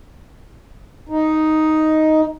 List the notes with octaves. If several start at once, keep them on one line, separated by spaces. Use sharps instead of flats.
D#4